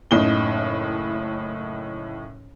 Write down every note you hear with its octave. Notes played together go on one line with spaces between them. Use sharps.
F#1 A2 D#4 G7